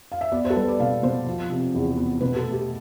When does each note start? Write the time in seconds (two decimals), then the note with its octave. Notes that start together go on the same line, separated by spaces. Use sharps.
0.12 F5
0.21 E5
0.32 B3 D5
0.45 C5
0.50 A4
0.56 G3 B4
0.68 D5
0.80 B2 F5
1.03 B2 C5
1.26 F3
1.50 C3
1.75 E2
1.97 B3
2.21 B2 B4
2.36 A4
2.45 A3
2.53 G4